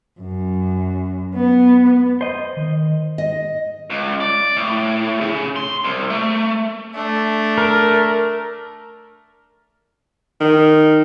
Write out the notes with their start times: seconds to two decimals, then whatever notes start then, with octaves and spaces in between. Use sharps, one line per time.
0.20 F#2
1.35 B3
2.21 C5 D#5
2.57 D#3
3.18 D#5
3.90 C#2
4.20 D5
4.57 A2
5.21 C#3
5.56 C6
5.84 C2
6.10 A3
6.94 A3 D4
7.58 A#4
10.40 D#3